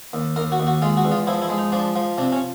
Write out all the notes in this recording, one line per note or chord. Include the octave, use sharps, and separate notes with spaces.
D#2
D#2 A#4
F#4
D#2
F#4
G#3 F4
F#4
E2
F4
F3 E4
E4
G#3
D#4
F3 D4
F3
C3 D4
C#4